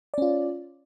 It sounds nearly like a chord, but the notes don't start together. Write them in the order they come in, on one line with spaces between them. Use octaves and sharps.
D5 C#4 F4